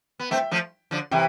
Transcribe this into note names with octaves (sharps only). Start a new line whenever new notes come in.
B3
A3 C4 E5 G5
F3 A3
D3 F3
C3 E3 E5 G5